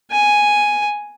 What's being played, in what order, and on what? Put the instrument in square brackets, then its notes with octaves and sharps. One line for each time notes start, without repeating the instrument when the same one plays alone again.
[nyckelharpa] G#5